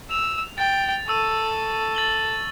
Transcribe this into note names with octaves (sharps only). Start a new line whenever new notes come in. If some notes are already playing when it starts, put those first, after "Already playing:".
E6 F7
G5 A6
A4 C#6 E6 D#7
A6 F#7 G7